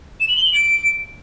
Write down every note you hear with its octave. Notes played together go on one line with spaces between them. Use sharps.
E7
F#7
G7
F#7
D7